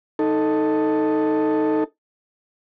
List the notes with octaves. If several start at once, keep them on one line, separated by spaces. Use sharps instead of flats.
D#4 A4